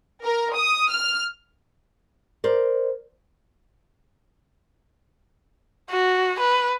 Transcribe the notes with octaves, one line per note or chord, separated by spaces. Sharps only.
A#4
D#6
F6
A#4 C5 D5
F#4
B4